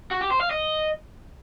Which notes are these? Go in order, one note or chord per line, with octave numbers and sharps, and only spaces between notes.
F#4
G4
C5
F5
D#5